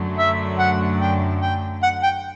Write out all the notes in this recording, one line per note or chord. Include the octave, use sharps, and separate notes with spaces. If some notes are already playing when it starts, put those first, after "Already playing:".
Already playing: F#2 D3 F#3 A3
E5
F#5
G5
G5
F#5
G5